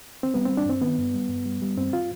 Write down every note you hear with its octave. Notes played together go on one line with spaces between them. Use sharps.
C4
G3 B3
G3 C4
D4
G2 C4
D#3 B3
G2
G3
G2
G3
G3
G2 C4
F4